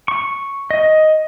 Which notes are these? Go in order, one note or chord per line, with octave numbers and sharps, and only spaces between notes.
C#6
D#5